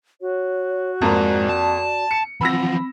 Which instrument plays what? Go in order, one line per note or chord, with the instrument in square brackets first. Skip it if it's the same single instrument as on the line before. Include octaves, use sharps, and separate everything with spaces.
[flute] F#4 [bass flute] C#5
[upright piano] F2 A#3 A#5 [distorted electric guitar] G#2 [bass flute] D5
[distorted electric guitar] A5
[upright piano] C#7
[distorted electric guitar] E3 F3 [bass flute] C4 [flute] F#5 [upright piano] B5 E6 A#6